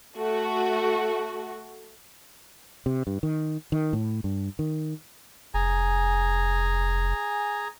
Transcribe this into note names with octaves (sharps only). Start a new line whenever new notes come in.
A3 F#4
C3
G2
D#3
D#3
A2
G2
D#3
F1 G#4 G#5 A#5